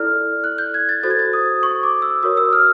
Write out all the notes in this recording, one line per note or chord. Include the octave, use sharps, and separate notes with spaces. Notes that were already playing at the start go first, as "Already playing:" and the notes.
Already playing: E4 A4 D5 F6
F#6
G6
G#6
A6
F#4 A4 C5 A6
G#6
A6
D#6
C#6
D6
E6
F#4 A#4 C#5 D#6
E6
F6